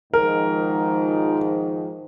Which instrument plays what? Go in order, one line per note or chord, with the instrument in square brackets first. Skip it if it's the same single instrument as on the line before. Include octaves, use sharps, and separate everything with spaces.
[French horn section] G#2 D#3 F3 [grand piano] A#4